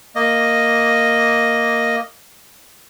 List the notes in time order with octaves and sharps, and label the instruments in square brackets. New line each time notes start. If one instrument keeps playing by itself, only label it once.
[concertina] A#3 D#5